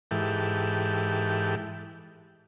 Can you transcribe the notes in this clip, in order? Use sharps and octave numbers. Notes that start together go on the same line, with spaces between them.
G#2 E3 G4 A4